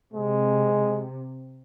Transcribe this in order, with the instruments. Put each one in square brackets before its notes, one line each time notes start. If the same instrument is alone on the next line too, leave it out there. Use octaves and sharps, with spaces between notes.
[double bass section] C3 [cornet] G#3